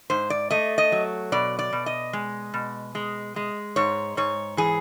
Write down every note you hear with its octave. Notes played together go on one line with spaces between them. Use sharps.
G#2 C5
D5
A3 D#5
D#5
F#3
B2 D5
D5
B2
D#5
G#3
B2
G#3
G#3
G#2 C#5
G#2 C#5
E3 G#4